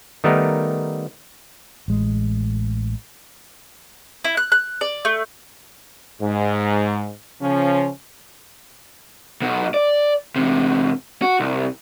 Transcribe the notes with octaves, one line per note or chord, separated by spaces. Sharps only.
D#3 G3 A3 B3 D#4 A#4
A1 G#3
E4
F#6
F#6
D5
A3
G#2
C#3 F3 C#4
B1 B2
D5
E2 C3
F#4
C2